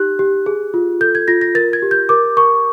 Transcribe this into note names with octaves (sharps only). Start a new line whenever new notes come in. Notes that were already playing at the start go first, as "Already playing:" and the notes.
Already playing: D#4 G4 F#6
G4
G#4
F4
A4 G6
G#6
F4 A#6
A#6
A#4 A6
G#6
G4
G6
A#4 D6
A#4 C#6